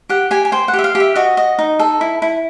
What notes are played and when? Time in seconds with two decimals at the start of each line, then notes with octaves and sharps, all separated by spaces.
0.09 G4 F#5
0.31 G4 G#5
0.45 G#5
0.52 C5 G5
0.68 F#5
0.74 G4
0.79 E5
0.84 F5
0.95 G4
1.00 E5
1.16 F#4 D#5
1.37 D#5
1.59 D#4
1.79 A4
2.01 E4
2.22 E4